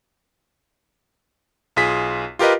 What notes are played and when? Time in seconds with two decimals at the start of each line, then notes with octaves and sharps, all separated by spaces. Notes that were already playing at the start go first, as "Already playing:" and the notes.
1.76 B1 F4 G#4 B6
2.39 F4 G4 A#4 B4 D#5